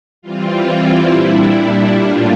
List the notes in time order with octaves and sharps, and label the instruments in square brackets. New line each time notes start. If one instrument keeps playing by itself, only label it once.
[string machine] E3 G3 C4 F4
E4
A#2 G3 D4
A2 G3 A#3 D4 F4